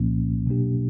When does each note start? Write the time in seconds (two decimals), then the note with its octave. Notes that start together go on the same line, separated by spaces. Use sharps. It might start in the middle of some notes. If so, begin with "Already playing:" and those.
Already playing: C2 A#2 F3 A#3 C#4
0.47 B2 F#3 A#3 D4 G4